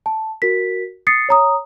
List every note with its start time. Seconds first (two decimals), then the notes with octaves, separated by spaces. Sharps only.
0.06 A5
0.42 F#4 A#4 B6
1.07 D#6 A6 C7 C#7
1.29 C#5 A#5 D#6